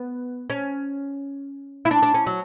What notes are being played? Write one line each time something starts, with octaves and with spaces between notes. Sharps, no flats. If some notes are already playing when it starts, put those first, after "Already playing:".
Already playing: B3
C#4
E4
D4
D4
C#4
F#3